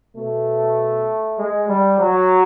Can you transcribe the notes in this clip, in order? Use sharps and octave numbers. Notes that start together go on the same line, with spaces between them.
B2 A3
G#3
G3
F#3